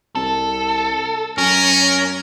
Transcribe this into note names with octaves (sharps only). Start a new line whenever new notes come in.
C2 A4
F#2 C#4 A#4